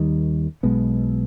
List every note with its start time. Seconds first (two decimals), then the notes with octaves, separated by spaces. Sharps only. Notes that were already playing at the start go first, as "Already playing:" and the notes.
Already playing: D#2 D#3 G3
0.63 B1 B2 G#3 B3